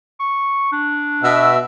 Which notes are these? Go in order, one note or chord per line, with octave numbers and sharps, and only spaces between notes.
C#6
D4
B2 E5